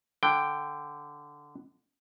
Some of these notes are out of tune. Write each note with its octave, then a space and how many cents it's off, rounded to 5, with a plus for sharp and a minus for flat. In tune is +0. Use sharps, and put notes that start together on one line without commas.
D3 +0 G5 +0